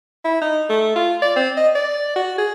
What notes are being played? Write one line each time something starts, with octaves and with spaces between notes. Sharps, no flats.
E4
D#4
A3
F4
D5
C4
D#5
D5
F#4
G#4